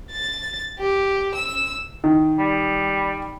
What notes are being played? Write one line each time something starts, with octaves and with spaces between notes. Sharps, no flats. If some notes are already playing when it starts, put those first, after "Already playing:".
A6
G4
E6
D#3
G3